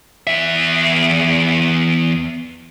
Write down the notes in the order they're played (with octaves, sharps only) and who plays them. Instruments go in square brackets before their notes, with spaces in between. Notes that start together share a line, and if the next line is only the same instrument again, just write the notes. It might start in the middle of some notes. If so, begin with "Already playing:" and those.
[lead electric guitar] E2 E5